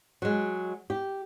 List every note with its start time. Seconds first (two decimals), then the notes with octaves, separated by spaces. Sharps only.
0.22 F#3 G#3
0.90 G4